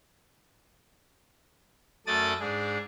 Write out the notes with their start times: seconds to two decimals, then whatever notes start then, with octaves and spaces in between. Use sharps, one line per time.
2.07 F#2 A3 A4 D5 D#6 A6
2.40 G#2 D4 G#4